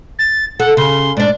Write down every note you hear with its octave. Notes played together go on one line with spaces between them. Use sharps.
A6
A4 F#5
C#3 C6
G#2 D4 D5